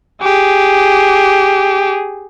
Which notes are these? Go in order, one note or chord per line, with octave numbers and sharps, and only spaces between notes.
G4 G#4